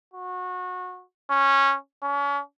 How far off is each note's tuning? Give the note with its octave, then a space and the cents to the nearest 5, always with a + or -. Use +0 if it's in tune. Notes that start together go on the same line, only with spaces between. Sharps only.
F#4 -25
C#4 -10
C#4 +35